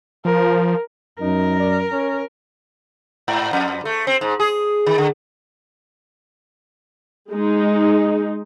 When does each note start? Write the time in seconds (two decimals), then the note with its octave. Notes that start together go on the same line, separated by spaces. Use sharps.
0.25 F3 A#4
1.21 F#2 D#4 A#4
1.59 D5
1.91 C#4
3.28 G#2
3.53 F2
3.85 A3
4.07 C4
4.21 G#2
4.40 G#4
4.86 D#3
4.98 D3
7.30 G#3 D#4